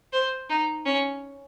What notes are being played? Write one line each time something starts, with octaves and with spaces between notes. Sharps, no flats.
C5
D#4
C#4